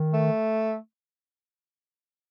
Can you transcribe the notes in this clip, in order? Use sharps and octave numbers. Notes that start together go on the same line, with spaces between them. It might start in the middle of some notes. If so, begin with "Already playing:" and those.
Already playing: D#3
A3